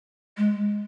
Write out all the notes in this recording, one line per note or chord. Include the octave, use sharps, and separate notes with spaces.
G#3